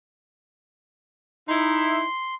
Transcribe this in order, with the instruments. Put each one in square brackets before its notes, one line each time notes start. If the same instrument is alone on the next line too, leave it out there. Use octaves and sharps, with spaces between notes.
[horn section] D#4 E4 [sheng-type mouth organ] C6